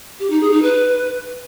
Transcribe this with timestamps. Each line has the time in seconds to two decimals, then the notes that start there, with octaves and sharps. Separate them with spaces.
0.20 G4
0.30 D#4
0.41 G#4
0.52 D#4
0.62 B4